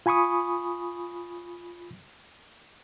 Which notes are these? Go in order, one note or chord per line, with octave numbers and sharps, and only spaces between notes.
F4 G#5 B5 C#6 D#6